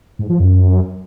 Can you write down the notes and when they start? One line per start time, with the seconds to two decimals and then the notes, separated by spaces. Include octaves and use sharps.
0.19 G#2
0.30 F3
0.40 F#2